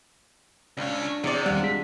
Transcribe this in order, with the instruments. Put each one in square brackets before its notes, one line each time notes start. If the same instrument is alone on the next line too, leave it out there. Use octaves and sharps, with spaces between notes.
[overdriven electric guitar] C#2 C#5 [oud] D4 F4
[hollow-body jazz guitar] E2 D5 [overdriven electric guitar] C3
[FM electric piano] D#2 G3 [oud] D4 F4 [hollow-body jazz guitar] F#5
[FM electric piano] G#3 B6